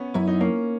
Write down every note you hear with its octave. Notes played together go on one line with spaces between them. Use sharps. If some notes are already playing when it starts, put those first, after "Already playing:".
Already playing: B3 C#4
F#2 E4
D#4
A#3 C#4